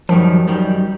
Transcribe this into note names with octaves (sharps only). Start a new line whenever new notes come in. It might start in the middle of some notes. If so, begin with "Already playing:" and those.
F#2 D#3 F3 G3
F#2 D#3 G3